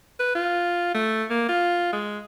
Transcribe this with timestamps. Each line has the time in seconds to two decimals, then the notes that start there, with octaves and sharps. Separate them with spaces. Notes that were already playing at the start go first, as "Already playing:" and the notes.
0.19 B4
0.35 F4
0.95 A3
1.30 A#3
1.49 F4
1.93 G#3